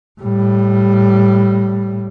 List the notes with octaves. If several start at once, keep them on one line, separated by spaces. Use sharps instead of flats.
A2 G3